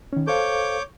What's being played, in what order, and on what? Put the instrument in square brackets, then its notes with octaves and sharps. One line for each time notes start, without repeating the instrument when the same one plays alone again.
[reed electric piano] D#3 C#4
[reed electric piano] A4 C5 F5 [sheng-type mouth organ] C#5 D6 G6